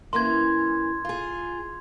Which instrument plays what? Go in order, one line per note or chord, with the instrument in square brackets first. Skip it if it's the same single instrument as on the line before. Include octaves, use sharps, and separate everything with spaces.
[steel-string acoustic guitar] E3 A#3 C#4 [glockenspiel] C6 G#6
[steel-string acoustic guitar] F4 G#4